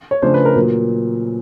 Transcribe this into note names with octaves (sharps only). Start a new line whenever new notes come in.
C#5
C#3 F3 A3 D4 C5
B4
A#4
A#2 F#3 A#3